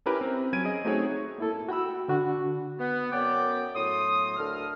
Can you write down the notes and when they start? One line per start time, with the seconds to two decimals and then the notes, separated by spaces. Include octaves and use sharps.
0.06 C#4 E4 G4 A#4 B4
0.21 C4
0.53 F#3 C#4 G#6 D7 D#7
0.65 G#4 D#5
0.85 A3 C4 D#4 F#4 G#4 C#5
1.38 A#3 E4 A4
1.69 F#4 G5 B5 E6
2.08 D3 D4 F#4
2.79 B3
3.12 F#2 F#3 B3 D5 G5 D6
3.75 A2 F#3 C6 D#6
4.37 D2 A4 A#4 F6